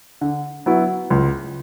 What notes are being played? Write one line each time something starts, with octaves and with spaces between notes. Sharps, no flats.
D3
F#3 B3 E4
C#2